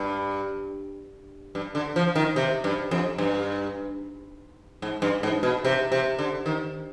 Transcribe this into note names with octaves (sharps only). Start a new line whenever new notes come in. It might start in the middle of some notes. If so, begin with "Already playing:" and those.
Already playing: G2
G2
D3
F3
D#3
C3
G2
F2
G2
G#2
G2
G#2
B2
C3
C3
D3
D#3